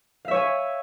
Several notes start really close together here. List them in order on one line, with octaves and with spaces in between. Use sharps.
F5 E5 C#5 G#5